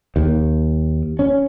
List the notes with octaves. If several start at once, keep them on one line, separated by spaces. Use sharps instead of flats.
D#2
C#4